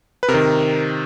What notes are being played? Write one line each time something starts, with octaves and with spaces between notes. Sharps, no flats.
B4
C3 A#4
D#3